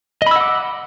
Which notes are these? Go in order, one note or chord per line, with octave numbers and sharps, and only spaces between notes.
D#5 F#5 B5 D6 E6